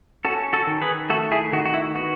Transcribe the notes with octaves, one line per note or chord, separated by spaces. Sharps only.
C#4 F#4 A4
F#4 A4
D#3
G#4 B4
A3 F#4 A4
E4 G#4
D#3 F#4
F#4
E4
B3 F#4